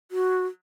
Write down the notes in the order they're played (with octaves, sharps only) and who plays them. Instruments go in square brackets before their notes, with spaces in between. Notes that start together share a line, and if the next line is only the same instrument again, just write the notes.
[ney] F#4